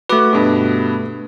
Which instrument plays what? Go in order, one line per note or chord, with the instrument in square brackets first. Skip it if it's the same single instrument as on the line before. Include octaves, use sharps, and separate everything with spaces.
[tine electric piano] A3 B4 [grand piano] F#4 D6
[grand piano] G2 B2